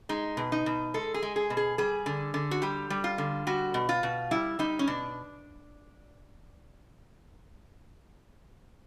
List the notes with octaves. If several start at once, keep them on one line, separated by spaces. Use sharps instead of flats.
G#3 D#4
B2
D#4
B2
G#3 A4
G#4
G#3
G#4
B2
G#4
G3 G#4
D3
D3
F#4
G3 G4
G3
F4
D3
G3 F#4
B2
F4
B2
G3 E4
G3 D#4
C#4
B2 D4